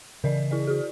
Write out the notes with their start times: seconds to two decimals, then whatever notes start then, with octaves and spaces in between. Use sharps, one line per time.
0.24 C#3 E3 A#4 D5 D#5
0.51 E4 G#4 D5
0.67 F#4 G#4